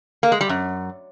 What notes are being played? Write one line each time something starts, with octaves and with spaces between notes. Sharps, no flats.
A#3
G#3
G3
F#2